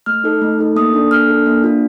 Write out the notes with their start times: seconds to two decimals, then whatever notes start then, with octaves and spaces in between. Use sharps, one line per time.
0.06 A3 F6
0.24 D#4 A4
0.42 A3
0.59 D#4 A4
0.76 A#3 D#6
0.94 D4 A4
1.11 A#3 F6
1.28 D4 A4
1.46 A#3
1.64 D4 F4